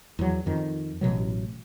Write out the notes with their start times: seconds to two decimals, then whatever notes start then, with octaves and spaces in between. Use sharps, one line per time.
0.19 E2 F#3
0.46 F2 D#3
1.01 A1 B2 E3 F#3